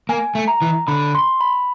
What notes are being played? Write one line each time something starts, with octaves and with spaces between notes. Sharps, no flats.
A#3 G#5
A3
A#5
E3
D3 B5
C6
B5